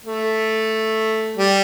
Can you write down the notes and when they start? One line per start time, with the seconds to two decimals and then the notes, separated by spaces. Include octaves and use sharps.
0.05 A3
1.38 G3